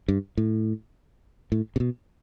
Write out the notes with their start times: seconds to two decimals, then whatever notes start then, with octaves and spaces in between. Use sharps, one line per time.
0.08 G2
0.38 A2
1.52 A2
1.76 C3
1.80 B2